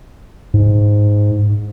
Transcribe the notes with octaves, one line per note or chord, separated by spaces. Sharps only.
G#2